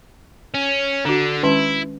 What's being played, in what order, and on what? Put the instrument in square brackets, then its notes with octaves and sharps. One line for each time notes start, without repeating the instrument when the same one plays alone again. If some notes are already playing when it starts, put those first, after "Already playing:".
[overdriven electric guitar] C#4
[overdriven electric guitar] D3 [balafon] D4 F#4
[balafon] D#3 G#3 C#4 [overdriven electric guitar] E4